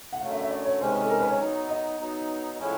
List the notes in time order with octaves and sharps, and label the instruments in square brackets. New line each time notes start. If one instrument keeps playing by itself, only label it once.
[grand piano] F#5
[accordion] F#2 D3 F#3 A3 [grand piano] F5
[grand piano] E5
E5
D5
C#5
[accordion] C3 D#3 G#3 C#4 [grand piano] C5
[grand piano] B4
A4
A#4
B4
C#5
[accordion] F#3 B3 D#4
[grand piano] D#5
[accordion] F#3 B3 D#4
A2 F3 G#3 C#4 E4